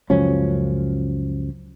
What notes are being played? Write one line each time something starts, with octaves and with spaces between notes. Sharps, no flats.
C#2 F#2 F3 C#4